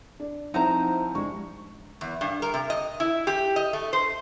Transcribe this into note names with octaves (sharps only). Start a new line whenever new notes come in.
D4
F3 C4 D#4 E4 C5 F#5 A#5
G2 G#3 C#6
E2
G2
A#4
C3
D#5
E4
G4
D#5
A3
C5